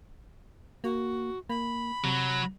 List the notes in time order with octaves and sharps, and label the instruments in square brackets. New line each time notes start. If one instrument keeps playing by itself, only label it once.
[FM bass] A#3 [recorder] F#4
[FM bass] A#3 [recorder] B5
[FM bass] C3 [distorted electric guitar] F#3